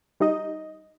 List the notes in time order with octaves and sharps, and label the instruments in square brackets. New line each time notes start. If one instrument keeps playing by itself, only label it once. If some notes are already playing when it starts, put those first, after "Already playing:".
[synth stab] G3 D#4 D#5